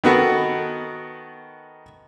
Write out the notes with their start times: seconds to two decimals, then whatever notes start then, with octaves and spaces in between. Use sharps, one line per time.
0.04 D#3 B3 F#4 A4